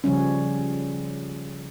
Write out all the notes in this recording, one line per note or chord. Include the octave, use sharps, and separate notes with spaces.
C#3 F3 G3 C#4